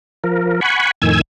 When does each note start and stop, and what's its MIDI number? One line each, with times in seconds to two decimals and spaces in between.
0.24 0.60 53
0.24 0.60 70
0.61 0.91 78
0.61 0.91 80
0.61 0.91 83
0.61 0.91 85
1.02 1.21 41
1.02 1.21 45
1.02 1.21 51
1.02 1.21 80
1.02 1.21 88
1.02 1.21 92